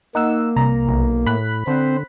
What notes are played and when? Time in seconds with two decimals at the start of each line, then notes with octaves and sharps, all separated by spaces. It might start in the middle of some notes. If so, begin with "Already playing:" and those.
0.15 A#3 D#4 F#5 E6
0.56 C2 A#5
0.88 B1
1.27 A2 B5 F#6 B6
1.67 D3 C4 C5